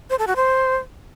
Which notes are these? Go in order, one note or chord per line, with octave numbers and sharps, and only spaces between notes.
C5
A4
F#4
C5